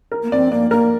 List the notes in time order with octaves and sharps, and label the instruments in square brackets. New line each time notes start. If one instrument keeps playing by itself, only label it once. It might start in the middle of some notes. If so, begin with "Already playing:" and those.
[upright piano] A#4
[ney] A#3
[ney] C4 [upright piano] D5
[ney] A#3 [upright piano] D5
[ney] A#3 [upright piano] A#4